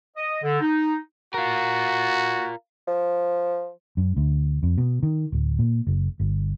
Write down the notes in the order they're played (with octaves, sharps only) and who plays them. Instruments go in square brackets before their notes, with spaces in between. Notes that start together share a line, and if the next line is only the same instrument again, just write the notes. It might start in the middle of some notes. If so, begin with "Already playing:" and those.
[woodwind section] D#5
D3
D#4
[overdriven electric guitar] F4 A#4 [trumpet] F#4
[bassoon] F3
[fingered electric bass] F#2
D2
F2
B2
D#3
D1
A#2
F#1
G1